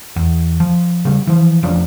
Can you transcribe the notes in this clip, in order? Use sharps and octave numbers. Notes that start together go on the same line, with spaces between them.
E2
F3
C#3 G3
E3 F3
F1 F3 C#4 D4